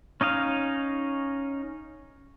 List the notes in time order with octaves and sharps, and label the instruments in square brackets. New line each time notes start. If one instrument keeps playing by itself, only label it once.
[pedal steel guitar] C#4 D#4 D#5 F5